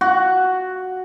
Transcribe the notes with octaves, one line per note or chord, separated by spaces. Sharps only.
F#4